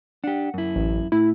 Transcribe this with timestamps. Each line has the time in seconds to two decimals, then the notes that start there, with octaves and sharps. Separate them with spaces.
0.24 D4 G4 F#5
0.54 F#2 E4
0.76 A1
1.12 A2 E4